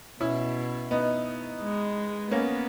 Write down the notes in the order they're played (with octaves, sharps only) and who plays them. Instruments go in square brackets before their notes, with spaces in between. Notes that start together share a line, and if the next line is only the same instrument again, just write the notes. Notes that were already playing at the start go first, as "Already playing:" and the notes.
[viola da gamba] B2 [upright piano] C#4 E4
[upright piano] B3 D#4
[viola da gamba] G#3
[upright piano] A#3 C#4 [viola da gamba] B3